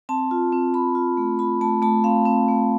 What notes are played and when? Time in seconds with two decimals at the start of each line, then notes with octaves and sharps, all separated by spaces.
0.09 C4 A5
0.31 F4
0.52 C4
0.74 C4 B5
0.95 F4
1.17 A3
1.39 F4 B5
1.61 A3 A5
1.82 A3 A5
2.04 C4 F5
2.25 C4
2.48 A3